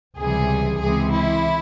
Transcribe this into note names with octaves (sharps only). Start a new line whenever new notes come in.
C#2 C3 E3 G3 G#4
C#2 C3 E3 G#3 G#4
E4